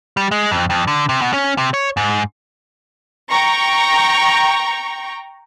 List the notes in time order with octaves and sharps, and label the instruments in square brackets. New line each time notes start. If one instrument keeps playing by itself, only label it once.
[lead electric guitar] G3
G#3
F2
F2
D3
C3
B2
C#4
C3
C#5
G#2
[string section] G5 A#5 C#6